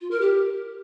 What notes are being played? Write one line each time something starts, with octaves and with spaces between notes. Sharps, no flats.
F4
A#4
G4